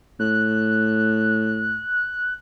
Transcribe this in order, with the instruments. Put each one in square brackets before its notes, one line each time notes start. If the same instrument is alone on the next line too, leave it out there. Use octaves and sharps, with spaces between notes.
[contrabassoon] A2 [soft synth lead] F#6